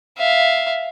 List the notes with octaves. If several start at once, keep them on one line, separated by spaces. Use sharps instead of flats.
E5 F5